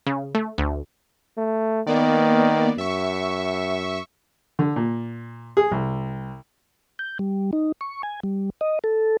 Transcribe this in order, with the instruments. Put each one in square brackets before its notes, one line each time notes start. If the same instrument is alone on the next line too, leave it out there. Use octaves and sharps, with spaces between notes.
[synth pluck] C#3
A3
D2
[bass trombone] A3
[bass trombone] D#3 [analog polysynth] A#3 B3 D5
[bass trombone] F#2 [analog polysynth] E5 C#6
[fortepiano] D3
A#2
G#4
C2
[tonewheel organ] G6
G3
D#4
C#6
G#5
G3
D#5
A4